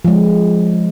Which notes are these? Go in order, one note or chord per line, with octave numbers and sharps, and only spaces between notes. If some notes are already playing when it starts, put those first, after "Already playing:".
F3 G#3